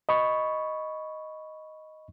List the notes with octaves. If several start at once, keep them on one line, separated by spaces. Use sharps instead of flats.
D#5 B5 C#6